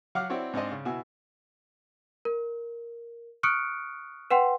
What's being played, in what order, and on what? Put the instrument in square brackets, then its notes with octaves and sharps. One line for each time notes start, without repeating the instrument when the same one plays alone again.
[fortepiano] F#3 F5 F#5 D6 F6
C4 E4 F#4 C#5 D5
G#2 C4 D4 D#5
C#3
B2 E4 F#4 G#5 E6
[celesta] A#4
C#6 D#6 F6 F#6 C#7 D7
B4 F#5 G5 C6